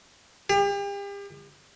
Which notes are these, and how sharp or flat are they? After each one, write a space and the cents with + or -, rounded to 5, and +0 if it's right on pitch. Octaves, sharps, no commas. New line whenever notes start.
G4 +40